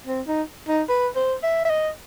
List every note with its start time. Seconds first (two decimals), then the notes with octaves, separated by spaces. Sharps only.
0.07 C4
0.27 D#4
0.68 D#4
0.89 B4
1.16 C5
1.43 E5
1.65 E5
1.70 D#5